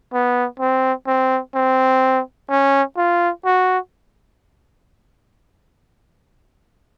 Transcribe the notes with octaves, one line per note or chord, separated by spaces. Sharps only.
B3
C4
C4
C4
C#4
F4
F#4